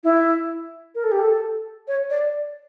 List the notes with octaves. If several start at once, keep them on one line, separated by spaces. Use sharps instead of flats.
E4
A#4
A4
G4
A4
C#5
D5